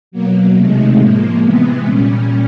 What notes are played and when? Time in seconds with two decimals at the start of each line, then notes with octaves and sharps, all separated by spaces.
0.12 B2 F#3 A#3
0.55 C3 D#3 G#3 A3
0.99 A2 F3 G#3 A#3
1.42 C3 E3 G#3 B3
1.86 A#2 G3 C#4